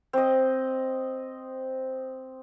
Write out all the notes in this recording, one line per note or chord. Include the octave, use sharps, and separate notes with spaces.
C4 D#5